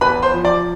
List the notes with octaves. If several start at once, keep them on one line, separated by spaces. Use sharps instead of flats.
E2 B4 B5
C5 C6
F3
D5 D6